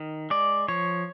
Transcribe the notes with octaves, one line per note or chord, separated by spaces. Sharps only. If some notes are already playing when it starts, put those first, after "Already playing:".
Already playing: D#3
G#3 D5
F3 C#5